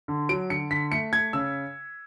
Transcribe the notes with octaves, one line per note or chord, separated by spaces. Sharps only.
D3
F#3 D7
D3 C#7
D3 B6
A3 C#7
A3 G#6
C#3 E6